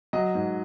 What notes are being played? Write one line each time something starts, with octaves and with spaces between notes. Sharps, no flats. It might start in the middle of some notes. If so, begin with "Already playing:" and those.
F#3 D#5
G#2